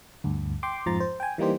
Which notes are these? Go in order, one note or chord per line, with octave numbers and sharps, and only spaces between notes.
D2 G2
G5 C6 D6
F2 G#2 F3 A#5 C6 A6
C5
G5 G#5
E3 G3 A#3 D#4 G4 C5